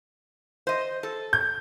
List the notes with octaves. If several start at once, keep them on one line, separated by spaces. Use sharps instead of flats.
C5 D#5
A4
G6